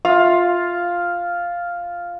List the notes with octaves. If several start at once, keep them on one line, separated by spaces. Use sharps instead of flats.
F4 F5